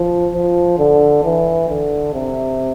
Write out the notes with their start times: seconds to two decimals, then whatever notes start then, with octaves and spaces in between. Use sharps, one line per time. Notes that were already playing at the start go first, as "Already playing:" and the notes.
Already playing: F3
0.34 F3
0.79 D3
1.24 E3
1.69 D3
2.14 C3